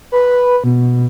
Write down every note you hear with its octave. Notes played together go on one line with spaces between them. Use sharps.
B4
B2